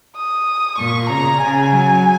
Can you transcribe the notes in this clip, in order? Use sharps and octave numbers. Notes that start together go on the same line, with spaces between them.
D#6
A#2 C#6
C#3 A#5
C#3 G#5
F#3